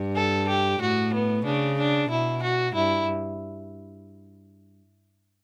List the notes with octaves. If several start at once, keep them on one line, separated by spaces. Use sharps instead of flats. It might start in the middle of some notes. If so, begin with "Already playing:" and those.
Already playing: G2
A4
G4
A2 F#4
B3
C#3 D4
D4
B2 E4
F#4
G2 E4